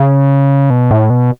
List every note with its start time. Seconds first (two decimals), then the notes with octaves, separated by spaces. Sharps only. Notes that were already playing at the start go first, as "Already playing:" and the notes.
Already playing: C#3
0.70 B2
0.91 A2
1.10 B2